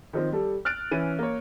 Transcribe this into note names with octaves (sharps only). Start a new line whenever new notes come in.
D#3 F3 C4
G3 A4
F6 F#6 A6 D7
E3 C#4 D#7
A#3 C#5